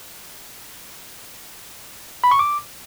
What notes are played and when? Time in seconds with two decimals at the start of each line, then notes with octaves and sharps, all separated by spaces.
2.24 B5
2.31 C#6
2.39 D6